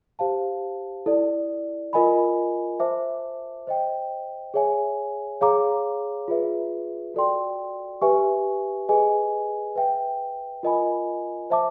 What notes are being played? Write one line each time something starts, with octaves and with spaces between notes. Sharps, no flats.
G4 C5 F5 A5
E4 A4 D5
F4 A#4 D#5 G#5 B5
C5 E5 A5 D6
C5 D#5 G5
G#4 C#5 E5 G#5
G#4 C#5 F5 A#5 D6
F4 G#4 B4 E5
F#4 A4 D5 G5 C6
G4 B4 E5 G#5 C#6
G#4 B4 D#5 G#5
B4 E5 G5
F4 A#4 D#5 G#5 B5
C5 E5 A5 D6